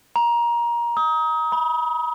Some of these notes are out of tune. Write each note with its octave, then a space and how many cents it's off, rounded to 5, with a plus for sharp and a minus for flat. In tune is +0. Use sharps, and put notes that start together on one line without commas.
A#5 +20
D#6 +30
B5 -35